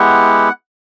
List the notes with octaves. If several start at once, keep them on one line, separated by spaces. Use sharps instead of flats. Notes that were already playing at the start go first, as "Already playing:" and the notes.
Already playing: G#3 B3 E4 G4 F#5